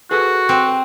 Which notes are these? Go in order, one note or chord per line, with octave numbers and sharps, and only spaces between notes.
F#4 G#4 A4 B4
C4